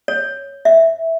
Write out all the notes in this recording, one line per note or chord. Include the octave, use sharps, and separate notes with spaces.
C#5
E5